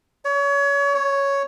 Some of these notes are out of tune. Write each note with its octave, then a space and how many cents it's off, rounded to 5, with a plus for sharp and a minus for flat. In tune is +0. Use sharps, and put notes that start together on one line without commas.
C#5 +30
C#5 +5